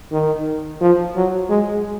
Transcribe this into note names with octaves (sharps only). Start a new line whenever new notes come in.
D#3
F3
F#3
G#3